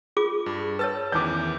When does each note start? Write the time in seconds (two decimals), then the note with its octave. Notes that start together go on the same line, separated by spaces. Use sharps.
0.17 F4 G#4 D6
0.46 G2
0.79 B4 C#5 A5 E6 A6
1.12 E2 D#3 E3 D6 G6